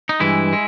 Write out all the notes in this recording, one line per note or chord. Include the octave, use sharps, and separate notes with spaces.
D#4
G2 E3 G#3 E4
G#3